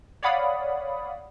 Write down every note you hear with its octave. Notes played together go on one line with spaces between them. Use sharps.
C#5 D5 F5 F#5 B5 D#6